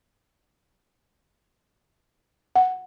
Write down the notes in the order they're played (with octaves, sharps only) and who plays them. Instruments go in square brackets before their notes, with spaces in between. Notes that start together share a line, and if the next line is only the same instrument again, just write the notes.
[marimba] F#5